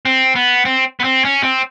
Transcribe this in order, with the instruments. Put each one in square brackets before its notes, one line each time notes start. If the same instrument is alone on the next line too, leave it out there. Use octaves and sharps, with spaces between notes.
[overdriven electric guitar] C4
B3
C4
B3
C4
C#4
C4